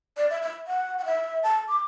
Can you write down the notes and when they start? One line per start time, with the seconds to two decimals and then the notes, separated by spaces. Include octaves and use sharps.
0.17 D5
0.30 E5
0.42 E5
0.67 F#5
0.98 F#5
1.05 E5
1.43 A5
1.69 D6